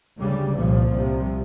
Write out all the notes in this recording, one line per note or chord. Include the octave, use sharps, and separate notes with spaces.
D2 C#3 G3
C2 A#2 F3
C2 C3